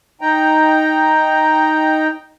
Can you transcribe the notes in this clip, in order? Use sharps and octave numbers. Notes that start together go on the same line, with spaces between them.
D#4 G5 A#5